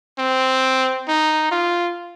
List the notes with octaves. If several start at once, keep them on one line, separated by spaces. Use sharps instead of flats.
C4
D#4
F4